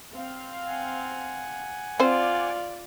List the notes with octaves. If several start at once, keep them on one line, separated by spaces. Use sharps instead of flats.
C4 F5
F#5 G#5
C4 F4 C5 D5